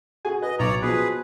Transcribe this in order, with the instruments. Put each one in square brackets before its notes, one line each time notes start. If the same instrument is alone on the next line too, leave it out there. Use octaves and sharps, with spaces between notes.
[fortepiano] F#4 G#4 G#5
[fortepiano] B4 [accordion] D#5
[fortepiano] B1 [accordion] C#5 D5 A#5
[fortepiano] B2 F3 [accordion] G#4 B4